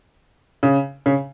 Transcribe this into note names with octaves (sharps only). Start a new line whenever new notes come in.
C#3
C#3